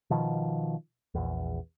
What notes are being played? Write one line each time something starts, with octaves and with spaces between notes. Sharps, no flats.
B2 D#3 F3
A#1 E2